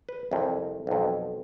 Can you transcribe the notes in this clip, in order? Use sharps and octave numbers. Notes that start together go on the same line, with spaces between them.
B4
C2 F2
B1 F2